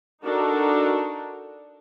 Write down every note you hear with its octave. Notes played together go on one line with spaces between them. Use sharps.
D4 D#4 F#4 A4 A#4